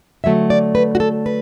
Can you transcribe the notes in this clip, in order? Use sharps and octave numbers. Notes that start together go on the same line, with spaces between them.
D3 F#3 A3 E5
D5
B4
F#4
A4
B4